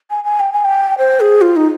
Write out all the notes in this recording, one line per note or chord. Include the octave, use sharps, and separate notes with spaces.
G#5
G#5
G5
G#5
G5
C5
G#4
F4
D#4